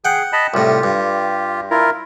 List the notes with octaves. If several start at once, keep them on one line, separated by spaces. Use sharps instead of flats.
G#4 F#5 G5
D#5 A5 B5
C2 A2 F4 G4
G2
E4 F4 A#4